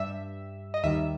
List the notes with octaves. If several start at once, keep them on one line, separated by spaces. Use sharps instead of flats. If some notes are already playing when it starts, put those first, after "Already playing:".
Already playing: G2 G3 E5
D#5
D#2 D#3 G3 E5